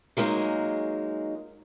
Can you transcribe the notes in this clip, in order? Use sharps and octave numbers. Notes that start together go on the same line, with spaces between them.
F#3 G#3 A#3 D#4 G#4